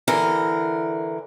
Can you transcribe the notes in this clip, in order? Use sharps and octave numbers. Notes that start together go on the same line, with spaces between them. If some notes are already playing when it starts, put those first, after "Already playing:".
D3 E3 A#4